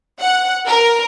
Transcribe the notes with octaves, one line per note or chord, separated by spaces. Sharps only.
F#5
A#4